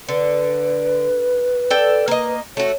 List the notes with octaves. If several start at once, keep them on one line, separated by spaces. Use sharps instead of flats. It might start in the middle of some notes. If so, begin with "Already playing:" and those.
D3 B4
A4 D5 G5
A#3 D#5
A3 F#4 C#5